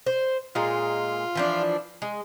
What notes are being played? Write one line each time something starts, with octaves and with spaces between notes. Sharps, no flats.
C5
A#2 G#3 F4
E3 F3 D4
G#3